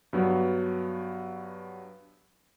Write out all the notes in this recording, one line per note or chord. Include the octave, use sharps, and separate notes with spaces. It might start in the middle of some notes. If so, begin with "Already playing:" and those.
G2 F#3 B3